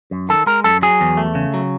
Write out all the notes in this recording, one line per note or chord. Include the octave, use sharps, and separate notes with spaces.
F#2
D#3 A4
G#3 A#4
F#2 A4
F#3 G#4
E2
A3
C#3
F#3